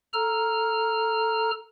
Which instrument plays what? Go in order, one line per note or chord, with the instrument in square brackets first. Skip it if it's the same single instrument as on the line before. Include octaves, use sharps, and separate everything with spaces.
[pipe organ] A4 A#5 F6